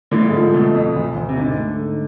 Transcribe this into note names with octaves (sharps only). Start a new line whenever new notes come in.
A2 D3
F2
G#2
F3
G#2
B2 A3
F2
D2
D2
C3
G#2 D3
A3
G#2